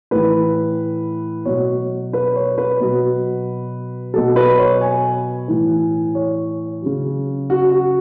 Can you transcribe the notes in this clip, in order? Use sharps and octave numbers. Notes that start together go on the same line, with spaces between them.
A2 E3 B4
B2 F#3 C#5
B4
C#5
B4
B2 F#3
B2 F#3 A4
B4
C#5
G#5
A2 E3
C#5
C#3 F#3
F#4
F#4